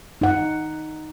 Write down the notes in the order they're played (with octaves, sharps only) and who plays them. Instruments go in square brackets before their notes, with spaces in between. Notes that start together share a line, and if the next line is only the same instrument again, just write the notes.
[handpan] D#4 F#5